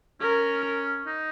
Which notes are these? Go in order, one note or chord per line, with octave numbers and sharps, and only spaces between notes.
C#4 A#4
D#4